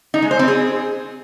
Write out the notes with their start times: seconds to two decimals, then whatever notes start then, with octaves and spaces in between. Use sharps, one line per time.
0.14 D#4
0.22 G#3
0.31 C5
0.39 C4
0.48 G#4